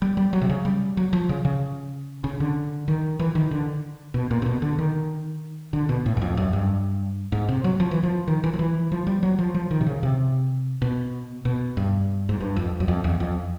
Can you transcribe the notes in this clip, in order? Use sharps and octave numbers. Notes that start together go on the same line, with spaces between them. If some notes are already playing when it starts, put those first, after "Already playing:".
G3
G3
F#3
C3
C#3
G3
F#3
F3
C#3
C#3
C#3
D3
D#3
E3
D#3
D3
B2
A#2
C3
B2
D3
D#3
D3
B2
A2
F#2
F2
F#2
G2
G#2
C3
F#3
F3
E3
F3
D#3
E3
F3
E3
F3
G3
F#3
F3
F3
D#3
C3
C#3
C3
B2
B2
G2
G#2
G2
F2
F#2
F2
E2
F2